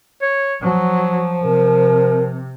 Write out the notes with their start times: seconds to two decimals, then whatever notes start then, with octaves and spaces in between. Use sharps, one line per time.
0.22 C#5
0.62 F3 F#3
1.43 C3 A#4